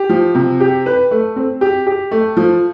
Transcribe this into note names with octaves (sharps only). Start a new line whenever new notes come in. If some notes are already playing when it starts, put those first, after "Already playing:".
Already playing: G4
F3
C3
G4
B4
A3
C4
G4
G4
A3
F3